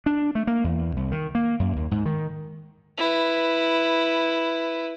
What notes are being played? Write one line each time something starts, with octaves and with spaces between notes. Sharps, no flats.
D4
A3
A#3
E2
C2
D#3
A#3
F#2
D#2
G#2
D#3
E4 B4